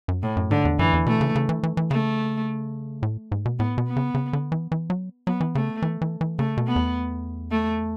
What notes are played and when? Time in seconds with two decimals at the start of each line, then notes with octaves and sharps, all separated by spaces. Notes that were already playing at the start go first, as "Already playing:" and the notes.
0.08 F#2
0.23 A2
0.37 F#2
0.51 G#2 D3
0.65 E2
0.79 F#2 E3
0.93 E2
1.06 B2 A3
1.21 C#3
1.35 C#3
1.49 E3
1.63 E3
1.77 E3
1.91 C#3 A3
3.03 A2
3.32 G#2
3.45 B2
3.59 A2 B3
3.78 B2
3.88 B3
3.96 C#3
4.14 C#3
4.33 D3
4.52 E3
4.72 E3
4.90 F#3
5.27 F#3 B3
5.40 E3
5.55 C#3 A3
5.82 E3
6.02 E3
6.21 E3
6.39 C#3 A3
6.57 B2
6.67 B3
6.76 E2
7.51 A3